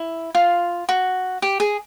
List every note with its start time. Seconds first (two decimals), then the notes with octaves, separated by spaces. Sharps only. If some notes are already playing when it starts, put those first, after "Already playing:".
Already playing: E4
0.35 F4
0.89 F#4
1.42 G4
1.60 G#4